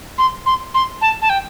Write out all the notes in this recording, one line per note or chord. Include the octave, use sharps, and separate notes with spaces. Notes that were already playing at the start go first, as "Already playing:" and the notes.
C6
C6
C6
A5
A5
G5